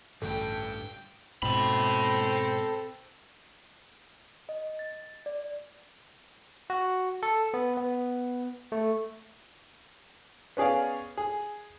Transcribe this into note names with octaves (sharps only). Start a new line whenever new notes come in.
A1 D2 G2 G4 A4 G5
G#2 B2 C4 A4 B5
D#5
A6
D5
F#4
A4
B3
B3
A3
B3 C#4 G#4 D5 F5
G#4